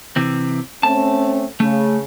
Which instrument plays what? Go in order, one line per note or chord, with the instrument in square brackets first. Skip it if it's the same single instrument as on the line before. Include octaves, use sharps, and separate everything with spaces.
[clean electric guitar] C3 E3 C4
[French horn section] A3 C4 C#4 [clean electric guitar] A5
[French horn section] C#3 [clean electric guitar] A3